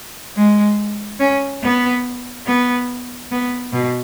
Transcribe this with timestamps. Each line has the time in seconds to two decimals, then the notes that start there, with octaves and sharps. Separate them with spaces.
0.36 G#3
1.20 C#4
1.63 B3
2.47 B3
3.31 B3
3.73 B2